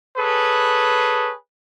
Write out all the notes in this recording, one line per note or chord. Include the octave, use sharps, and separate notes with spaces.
G#4 A4 B4 C#5